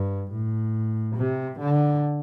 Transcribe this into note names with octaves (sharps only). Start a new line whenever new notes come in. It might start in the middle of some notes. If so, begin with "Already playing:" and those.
Already playing: G2
A2
C3
D3